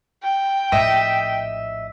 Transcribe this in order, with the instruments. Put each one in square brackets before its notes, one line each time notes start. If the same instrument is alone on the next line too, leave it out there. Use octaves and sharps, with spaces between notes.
[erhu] G5
[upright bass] A#1 A2 [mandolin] D#5 E5